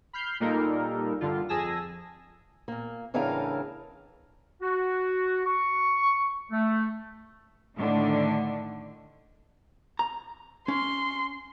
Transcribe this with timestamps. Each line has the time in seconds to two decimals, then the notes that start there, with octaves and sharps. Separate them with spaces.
0.13 B5 F6 G6 C7
0.40 A#2 G3 A#3 D#4 A4 A#4
1.21 G2 D3 F4
1.49 F2 G#4 G#5 A5 E6 A#6
2.68 A#2 A#3
3.14 A2 C#3 E3 D4 A#4 F5
4.62 F#4
5.45 C#6
6.51 A3
7.76 A2 D3 D#3 D4
9.99 A#5
10.68 C#4 C6